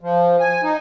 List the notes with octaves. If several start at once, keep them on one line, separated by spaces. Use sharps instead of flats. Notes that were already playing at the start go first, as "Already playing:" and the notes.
F3
G#5
D#4